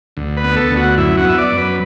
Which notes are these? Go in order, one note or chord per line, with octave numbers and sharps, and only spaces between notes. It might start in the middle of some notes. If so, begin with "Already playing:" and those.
D2
B4
B3
A4
D2
F#4
F#2 E4
F#4
B3 E5
D5
F#2
B4